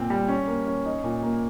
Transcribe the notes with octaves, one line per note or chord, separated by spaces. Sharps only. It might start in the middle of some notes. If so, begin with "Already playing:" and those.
Already playing: A#2 C4
G3
C#4
A#3
C#4
D#4
A#2
A#3